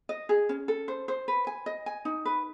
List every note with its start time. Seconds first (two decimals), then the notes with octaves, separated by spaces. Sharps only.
0.09 D#5
0.29 G#4
0.49 C#4
0.68 A4
0.88 C5
1.08 C5
1.28 B4
1.47 G#5
1.66 D#5
1.86 G#5
2.05 D#4
2.25 B4